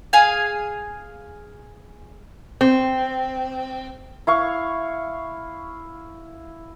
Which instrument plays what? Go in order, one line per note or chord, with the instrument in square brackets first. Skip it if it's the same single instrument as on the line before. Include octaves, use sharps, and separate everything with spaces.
[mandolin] G#4 F5 G#5
[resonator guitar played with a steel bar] C4
[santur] E4 F5 C#6